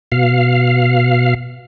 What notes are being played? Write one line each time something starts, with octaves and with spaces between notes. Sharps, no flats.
B2 F5